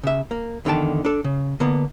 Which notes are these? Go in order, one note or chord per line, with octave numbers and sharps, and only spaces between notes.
C#3 E5
A#3
E2 D3 D#3 G5 A5
D4 A4
C#3
D3 A#3 B3